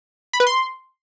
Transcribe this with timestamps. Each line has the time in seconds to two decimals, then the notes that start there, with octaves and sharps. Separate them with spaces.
0.33 B5
0.40 B4
0.47 C6